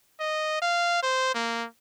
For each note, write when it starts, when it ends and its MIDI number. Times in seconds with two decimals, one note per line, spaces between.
0.20 0.57 75
0.62 0.99 77
1.03 1.30 72
1.34 1.65 58